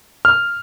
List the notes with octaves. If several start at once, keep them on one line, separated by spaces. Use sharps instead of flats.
F6